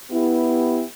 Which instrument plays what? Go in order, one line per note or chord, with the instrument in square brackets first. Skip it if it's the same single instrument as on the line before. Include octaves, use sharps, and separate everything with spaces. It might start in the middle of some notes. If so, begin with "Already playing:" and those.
[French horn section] B3 E4 G4